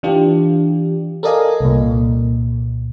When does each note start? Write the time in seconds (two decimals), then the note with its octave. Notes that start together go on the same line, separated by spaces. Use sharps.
0.03 E3 D4 F4 G4
1.23 A4 A#4 D5 D#5 F5 G#5
1.60 C2 A#2